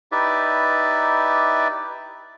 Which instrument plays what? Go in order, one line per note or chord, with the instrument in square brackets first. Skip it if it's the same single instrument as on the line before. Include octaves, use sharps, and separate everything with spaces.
[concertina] D#4 E4 G4 B4 D5 E5